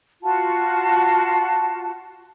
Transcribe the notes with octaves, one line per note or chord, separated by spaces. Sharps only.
F4 F#4 F#5 A5